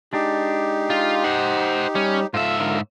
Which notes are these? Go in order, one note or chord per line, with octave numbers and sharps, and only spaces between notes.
G#3 D4 D#4 G4
F4
C5 F#5
G3 C#4
G#2 F4 A4 E5
D3 F4 A#4